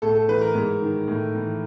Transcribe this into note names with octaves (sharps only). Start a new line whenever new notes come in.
A2 A4
A4
E3 B4
A#4
G#2
D#3
A2
E3